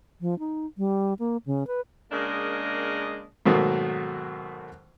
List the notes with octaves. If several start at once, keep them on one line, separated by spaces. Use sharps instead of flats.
F3
D#4
G3
A#3
C#3
B4
C#3 G#3 A#3 D4 A#4 D#5
G#2 B2 D#3 F#3 A3 A#3